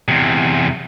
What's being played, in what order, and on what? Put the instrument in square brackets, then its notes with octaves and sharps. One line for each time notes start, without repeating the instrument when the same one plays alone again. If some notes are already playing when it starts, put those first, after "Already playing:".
[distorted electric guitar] E2 C3